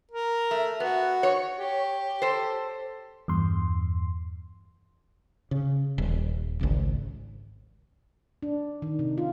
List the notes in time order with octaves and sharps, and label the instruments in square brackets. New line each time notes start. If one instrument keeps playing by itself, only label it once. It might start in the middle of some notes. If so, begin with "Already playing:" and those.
[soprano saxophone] A#4
[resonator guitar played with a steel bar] A3
[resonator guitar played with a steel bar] B3 [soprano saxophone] F#4
[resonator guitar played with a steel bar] C#5
[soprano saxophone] G4
[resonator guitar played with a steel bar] A4 C5
[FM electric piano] E2 G2 C6
[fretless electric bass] C#3
D#1
G#1 C#2
[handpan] D4
D#3
C3
F4